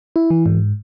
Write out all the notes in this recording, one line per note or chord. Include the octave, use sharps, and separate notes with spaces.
E4
E3
G#2